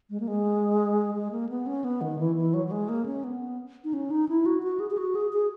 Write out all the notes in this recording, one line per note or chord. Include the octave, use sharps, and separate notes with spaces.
G#3
A#3
G#3
G#3
A#3
B3
C#4
B3
D#3
E3
E3
F#3
F#3
G#3
A#3
C#4
B3
D#4
C#4
D#4
E4
F#4
F#4
G#4
G#4
F#4
G#4
G#4